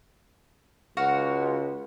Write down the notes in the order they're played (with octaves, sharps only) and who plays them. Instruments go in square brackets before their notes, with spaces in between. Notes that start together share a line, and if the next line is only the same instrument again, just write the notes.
[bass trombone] C#2 [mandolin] F#4 F5 F#5